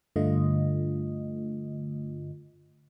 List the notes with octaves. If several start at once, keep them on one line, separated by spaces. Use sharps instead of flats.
G2 D3 A3 F4 D#5